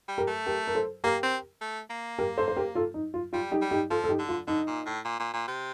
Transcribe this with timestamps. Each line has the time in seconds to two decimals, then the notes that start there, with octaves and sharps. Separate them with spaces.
0.08 G3
0.18 G4 A#4
0.27 A3
0.46 G4 A#4
0.67 A#4
0.75 A4 C5
1.03 A#3 G4 A#4
1.23 C4
1.61 A3
1.90 A#3
2.19 G4 A#4
2.38 A4 C5
2.48 C5
2.56 G4 A#4
2.75 F4 A4
2.94 D#4
3.14 F4
3.33 G3 F4
3.51 D#4 G4
3.61 G3
3.71 D#4 G4
3.90 F3 F4 A4
4.04 A4
4.09 D#4 G4
4.19 D3
4.29 F4
4.47 D3 D#4
4.67 A#2
4.86 A2
5.05 A#2
5.19 A#2
5.33 A#2
5.48 C3